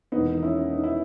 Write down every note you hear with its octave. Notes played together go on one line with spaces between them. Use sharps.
E1 E2 D#3 A#3 B3 D#4
C#4 E4
D#4
E4